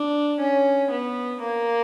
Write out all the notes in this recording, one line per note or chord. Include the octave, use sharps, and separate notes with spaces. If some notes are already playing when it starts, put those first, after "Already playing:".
Already playing: D4
C#4
B3
A#3